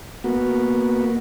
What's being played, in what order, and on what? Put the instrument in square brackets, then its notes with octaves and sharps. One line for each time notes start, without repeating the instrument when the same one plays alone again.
[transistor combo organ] A#3 B3 F#4